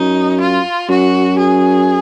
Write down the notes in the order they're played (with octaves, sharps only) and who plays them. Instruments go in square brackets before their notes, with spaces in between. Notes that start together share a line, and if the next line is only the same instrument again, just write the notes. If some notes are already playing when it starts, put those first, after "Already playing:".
Already playing: [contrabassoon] F#2 [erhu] D#4
[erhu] F4
[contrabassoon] F#2 [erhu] F#4
[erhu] G#4